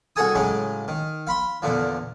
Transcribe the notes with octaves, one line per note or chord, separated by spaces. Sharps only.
C2 F#4 G#4 A4 G#5 D#6
A2 C#3 F#3 G#3
D#3
F5 B5 C6
E2 A#2 D3 F3